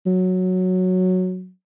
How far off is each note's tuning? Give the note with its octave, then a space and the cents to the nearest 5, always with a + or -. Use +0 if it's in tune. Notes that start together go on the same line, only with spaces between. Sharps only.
F#3 -5